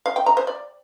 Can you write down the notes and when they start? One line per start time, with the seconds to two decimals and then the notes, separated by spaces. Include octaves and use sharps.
0.06 F5
0.16 G5
0.26 A#5
0.37 C5
0.47 D5